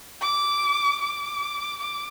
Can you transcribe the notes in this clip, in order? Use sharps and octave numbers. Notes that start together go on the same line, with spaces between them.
D6
D6
D6